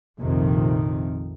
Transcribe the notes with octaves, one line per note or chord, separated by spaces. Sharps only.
A#1 F2 C3 D#3